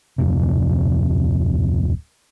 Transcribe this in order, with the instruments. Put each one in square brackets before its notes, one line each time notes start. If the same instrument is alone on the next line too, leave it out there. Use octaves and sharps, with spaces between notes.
[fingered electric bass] D1 F2 C3